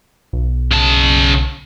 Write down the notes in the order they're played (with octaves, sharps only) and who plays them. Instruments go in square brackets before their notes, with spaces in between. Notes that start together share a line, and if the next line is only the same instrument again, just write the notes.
[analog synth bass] B1
[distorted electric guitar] C#3 A5